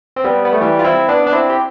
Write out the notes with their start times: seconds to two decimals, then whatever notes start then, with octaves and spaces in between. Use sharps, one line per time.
0.16 C4
0.24 G3 B3
0.45 B3
0.53 A3
0.61 E3 G3
0.79 F4
0.84 C4 E4
1.08 B3 D4
1.26 D4
1.32 C4 E4
1.50 G4